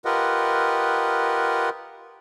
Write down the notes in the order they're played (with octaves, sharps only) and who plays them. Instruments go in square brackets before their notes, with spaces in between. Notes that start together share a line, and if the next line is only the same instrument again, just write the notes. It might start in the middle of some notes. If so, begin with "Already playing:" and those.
[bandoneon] F4 G4 A#4 B4 D#5 F#5